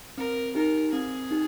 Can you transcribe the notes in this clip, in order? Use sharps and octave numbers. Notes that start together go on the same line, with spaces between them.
C4 A#4
D#4 G4 A#4
C4 G#4
D#4 G4